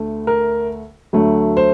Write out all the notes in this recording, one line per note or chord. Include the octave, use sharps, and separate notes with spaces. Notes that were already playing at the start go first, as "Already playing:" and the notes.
Already playing: D2 D3 A3
A#4
D2 D3 F#3 A3
C5